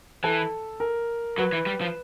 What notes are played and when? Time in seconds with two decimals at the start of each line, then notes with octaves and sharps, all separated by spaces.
0.24 E3 A4
0.80 A#4
1.38 F#3 B4
1.53 E3
1.66 G3
1.81 F3